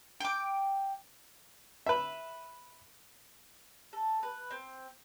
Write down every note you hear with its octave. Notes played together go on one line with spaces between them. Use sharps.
G5 D6
B4 E5
A4
B4
C4